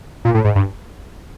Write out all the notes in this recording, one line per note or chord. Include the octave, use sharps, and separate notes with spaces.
A#2
A2
G#2
G2